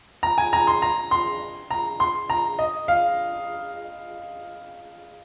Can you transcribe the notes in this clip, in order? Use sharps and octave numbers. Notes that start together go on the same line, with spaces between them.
A#5
G#5
A#5
C6
A#5
C6
A#5
C6
A#5
D#5
F5